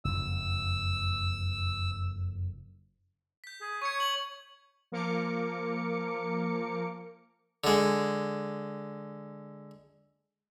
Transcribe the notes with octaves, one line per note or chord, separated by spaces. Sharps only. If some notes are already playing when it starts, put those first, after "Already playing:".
F#1 F2 E6
G6 B6
G#4
C#5 C#6 G#6 C#7
F#7
F3 A#3 A#4 D6 C#7
D3 G#3